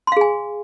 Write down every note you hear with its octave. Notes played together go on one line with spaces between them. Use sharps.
G#4 F5 G#5 C6